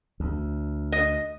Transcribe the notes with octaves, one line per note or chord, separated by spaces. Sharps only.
D2
D#5